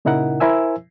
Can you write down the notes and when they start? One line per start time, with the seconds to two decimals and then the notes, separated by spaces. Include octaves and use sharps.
0.05 A#2 C#3 D#4 E4 A#4 F#5
0.40 E4 A#4 C5 E5 G#5 E6